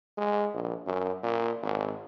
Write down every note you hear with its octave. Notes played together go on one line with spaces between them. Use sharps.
G#3
A#1
F#2
A#2
G#1